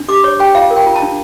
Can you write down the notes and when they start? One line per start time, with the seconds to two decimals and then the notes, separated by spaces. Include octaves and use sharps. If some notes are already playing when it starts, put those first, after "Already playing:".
Already playing: D4
0.08 G4 D6
0.24 C#5 C#6
0.39 G4 G5
0.55 F4 F5
0.70 A#4
0.76 G5
0.87 F4
0.96 A5
1.02 D4